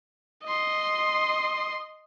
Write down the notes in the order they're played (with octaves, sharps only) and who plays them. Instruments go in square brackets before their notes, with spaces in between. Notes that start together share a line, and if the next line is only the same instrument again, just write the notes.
[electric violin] D#5 C6